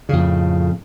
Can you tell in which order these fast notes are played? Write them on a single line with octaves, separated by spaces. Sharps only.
C#3 F2 A2